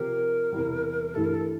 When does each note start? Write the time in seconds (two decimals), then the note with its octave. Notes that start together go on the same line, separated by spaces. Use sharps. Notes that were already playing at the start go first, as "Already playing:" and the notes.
Already playing: C3 F3 C4 G4 A#4
0.52 E2 C3 E3 G3
1.14 G2 E3 A3 E4 G4 A4
1.24 A#4
1.34 A4